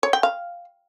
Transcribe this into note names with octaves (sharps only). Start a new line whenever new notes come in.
C#5
G5
F5